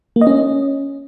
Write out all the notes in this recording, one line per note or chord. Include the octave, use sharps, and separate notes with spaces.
A#3
D#5
C#4